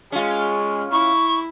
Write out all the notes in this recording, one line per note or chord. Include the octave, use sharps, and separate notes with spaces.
G#3 C#4 F4
E4 C#6